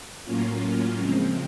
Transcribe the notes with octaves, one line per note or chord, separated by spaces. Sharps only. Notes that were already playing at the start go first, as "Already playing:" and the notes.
A2 F#3 A#3 C#4 F4
C#3 F3 G#3 C4